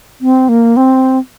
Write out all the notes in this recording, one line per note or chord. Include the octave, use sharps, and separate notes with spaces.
C4
A#3
C4